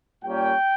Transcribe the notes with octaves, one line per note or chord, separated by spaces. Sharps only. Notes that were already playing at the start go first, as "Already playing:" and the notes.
A#2 G3 A#3 C#4 G5